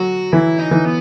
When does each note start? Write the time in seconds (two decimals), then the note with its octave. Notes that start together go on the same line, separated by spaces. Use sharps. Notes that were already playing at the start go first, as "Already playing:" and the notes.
Already playing: F#3 F#4
0.32 E3 E4
0.59 D#4
0.71 E3
0.85 B3